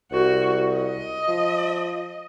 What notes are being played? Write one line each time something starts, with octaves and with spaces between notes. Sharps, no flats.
C2 F#4
D#5
F3